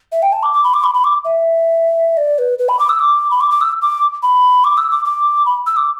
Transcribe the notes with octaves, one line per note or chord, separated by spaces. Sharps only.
E5
G5
A5
D6
D6
B5
D6
B5
B5
D6
E5
D5
B4
B4
B5
D6
E6
D6
B5
D6
D6
E6
D6
B5
D6
E6
D6
D6
B5
E6
D6